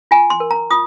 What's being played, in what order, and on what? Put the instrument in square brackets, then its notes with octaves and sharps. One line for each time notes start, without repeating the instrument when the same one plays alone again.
[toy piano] F4 G#5
C6
A#4
A#5
F4 D#6